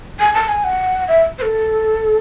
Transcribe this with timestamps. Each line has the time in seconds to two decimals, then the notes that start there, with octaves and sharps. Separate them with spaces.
0.20 G#5
0.34 A5
0.49 G#5
0.64 F#5
1.08 E5
1.39 C5
1.42 A4